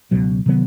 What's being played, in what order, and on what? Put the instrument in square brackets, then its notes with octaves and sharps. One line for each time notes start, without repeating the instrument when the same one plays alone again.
[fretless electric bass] C#2 B2 F#3
C3 D#3 F#3 B3